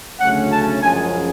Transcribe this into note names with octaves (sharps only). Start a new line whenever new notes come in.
D2 C#3 F#3 A3 C#4 F#5
A5
F#2 C#3 F3 G#3 G#5